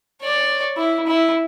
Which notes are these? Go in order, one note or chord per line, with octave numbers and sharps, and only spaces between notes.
C#5 D5
E4
E4